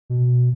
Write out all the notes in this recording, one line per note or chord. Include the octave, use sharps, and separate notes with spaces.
B2